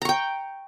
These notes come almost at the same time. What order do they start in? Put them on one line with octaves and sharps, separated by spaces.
A#5 C#6 G5